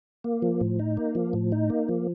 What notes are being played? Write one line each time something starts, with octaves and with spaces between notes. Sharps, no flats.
A#3
F3
A2
D#4
A#3
F3
A2
D#4
A#3
F3